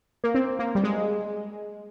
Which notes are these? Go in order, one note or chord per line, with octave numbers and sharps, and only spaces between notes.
A#3
C4
A#3
G3
G#3